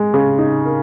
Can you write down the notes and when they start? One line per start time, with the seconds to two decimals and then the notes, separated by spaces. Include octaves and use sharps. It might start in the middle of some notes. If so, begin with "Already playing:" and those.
Already playing: G#3
0.14 C#3
0.38 D#4
0.65 A#4